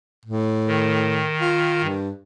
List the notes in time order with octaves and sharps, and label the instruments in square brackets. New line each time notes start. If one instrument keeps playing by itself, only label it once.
[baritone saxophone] A2
[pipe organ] D#3
[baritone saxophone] F4
G2